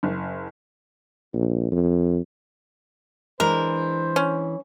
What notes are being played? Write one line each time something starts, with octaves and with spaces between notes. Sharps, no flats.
F#1
A#1
F2
E3 G#3 D4 A#4 C5
C#4